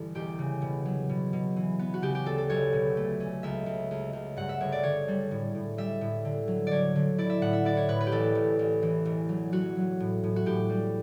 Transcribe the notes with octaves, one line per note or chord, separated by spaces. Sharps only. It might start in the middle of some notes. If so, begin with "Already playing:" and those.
Already playing: G1 E3
E1 G4
C#3
B2
F#3
B2
B2
E3
B3
F#4
C#3 G4
G4
D2 A4
A4
B1 C#5
B2
A3
C#4
C#2 E5
C#2
C#2
C#2
G2 F#5
E5
G1 C#5
D5
D3 C#5
G3
A2
A2
G3 E5
A2
D3
F#3
D3 C#5 D5
D3
E4 D5
E5
A2 F#5
E5
E4 D5
C#5
A2 B4
B4
G4
A1 A4
A1
A1
E3
E1
F#3
F#3 F#4
F#3
A2
A2
F#4
A2 G4
G3